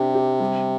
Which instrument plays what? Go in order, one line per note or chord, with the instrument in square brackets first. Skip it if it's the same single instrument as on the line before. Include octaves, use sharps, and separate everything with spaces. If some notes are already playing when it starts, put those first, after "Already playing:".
Already playing: [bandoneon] C3 [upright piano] D4 G4
[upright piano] G4
G3